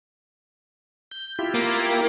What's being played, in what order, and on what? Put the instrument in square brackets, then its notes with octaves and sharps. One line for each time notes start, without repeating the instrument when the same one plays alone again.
[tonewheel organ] G6
E4 F4 G4
[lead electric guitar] A#3